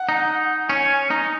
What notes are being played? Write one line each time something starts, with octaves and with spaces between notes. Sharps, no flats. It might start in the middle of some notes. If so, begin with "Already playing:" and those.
Already playing: F#5
D#4
C#4 G#5
D#4